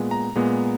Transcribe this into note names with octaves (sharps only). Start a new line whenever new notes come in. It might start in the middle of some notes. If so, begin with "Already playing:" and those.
Already playing: A#2 G#3 B3
A#5
A#2 G#3 B3